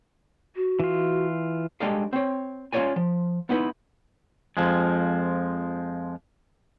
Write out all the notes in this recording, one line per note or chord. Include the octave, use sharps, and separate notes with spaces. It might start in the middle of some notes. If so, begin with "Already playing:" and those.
F#4
E3 F4
G3 G#3 D4 A4 D#5 F5
C4 C#5
C#4 F4 F#4 C#5 D5 G#5
F3
B3 D#4 E4 B4
F2 F3 G#3